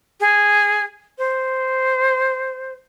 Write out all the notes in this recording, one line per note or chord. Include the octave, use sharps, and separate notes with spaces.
G#4
C5